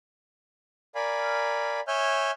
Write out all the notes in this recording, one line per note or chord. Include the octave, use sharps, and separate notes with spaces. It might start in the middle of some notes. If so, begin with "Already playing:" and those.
A#4 D5 F5 G#5 B5
C#5 E5 G#5 F6 G6